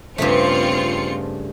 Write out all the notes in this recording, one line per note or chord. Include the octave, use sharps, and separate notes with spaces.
G2 C#3 A3 C4 F4 C#7